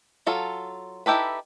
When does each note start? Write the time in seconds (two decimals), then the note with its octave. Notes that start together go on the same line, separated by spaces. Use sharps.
0.26 F#3 F4 A4
1.06 D#4 E4 G4 A4 B4